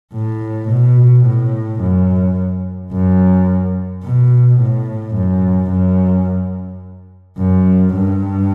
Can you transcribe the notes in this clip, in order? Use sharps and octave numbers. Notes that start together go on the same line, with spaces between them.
A2
B2
A2
F#2
F#2
B2
A2
F#2
F#2
F#2
G2